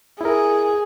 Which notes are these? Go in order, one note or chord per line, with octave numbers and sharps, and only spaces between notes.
E4 G#4 A#4